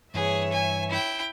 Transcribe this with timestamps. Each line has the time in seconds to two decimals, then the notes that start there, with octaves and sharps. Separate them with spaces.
0.14 G2 E3 G#4 B4 C#5 E5
0.52 G#5
0.90 E4 G5